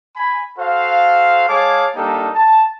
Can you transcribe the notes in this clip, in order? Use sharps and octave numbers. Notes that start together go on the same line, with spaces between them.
G#5 B5
F#4 A4 C5 F5
G#3 G#4 C#5 F5 A5 D6
G3 A#3 D4 D#4 G4 A4
A5